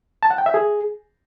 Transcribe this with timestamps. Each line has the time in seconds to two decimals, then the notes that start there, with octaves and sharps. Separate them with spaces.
0.23 A5
0.30 F#5
0.38 G5
0.46 E5
0.54 G#4